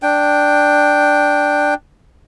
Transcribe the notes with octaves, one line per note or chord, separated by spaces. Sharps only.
D4 G5